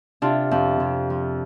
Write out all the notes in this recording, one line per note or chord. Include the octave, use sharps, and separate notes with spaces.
C3 D4 F4
F2
C3
F3